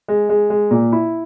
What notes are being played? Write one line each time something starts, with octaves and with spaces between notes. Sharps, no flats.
G#3
G#3
G#3
A#2
E4